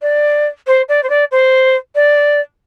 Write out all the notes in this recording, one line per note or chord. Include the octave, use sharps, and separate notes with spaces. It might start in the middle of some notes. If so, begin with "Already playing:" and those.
D5
C5
D5
C5
D5
C5
D5